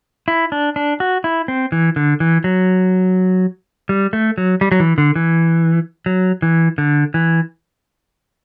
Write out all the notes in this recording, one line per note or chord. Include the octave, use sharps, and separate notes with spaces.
E4
D4
D4
F#4
E4
C4
E3
D3
E3
F#3
G3
A3
F#3
G3
F#3
E3
D3
E3
F#3
E3
D3
E3